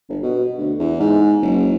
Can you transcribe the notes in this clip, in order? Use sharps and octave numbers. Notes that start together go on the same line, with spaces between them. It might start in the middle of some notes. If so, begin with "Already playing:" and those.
G1
B2
D2
E2
G#2
F#1